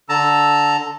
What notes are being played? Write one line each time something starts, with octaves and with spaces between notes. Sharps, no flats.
D3 A5 A#5 E6